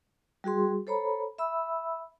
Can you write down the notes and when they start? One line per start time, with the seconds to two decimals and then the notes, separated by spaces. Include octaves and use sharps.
0.44 G3 F#4 G#4 C6
0.87 A4 C5 C#5 A#5 B5
1.38 E5 B5 E6